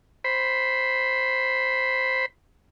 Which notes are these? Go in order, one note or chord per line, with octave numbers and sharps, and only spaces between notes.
C5 B5